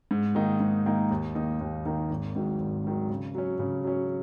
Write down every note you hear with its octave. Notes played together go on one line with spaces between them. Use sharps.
G#2
D#3 A#3 D#4
G#2
D#3 A#3 D#4
D#2
D#3 A#3 D#4
D#2
D#3 A#3 D#4
G#1
G#2 D#3 F#3
G#1
G#2 D#3 F#3
C#3
F#3 C#4
C#3
F#3 C#4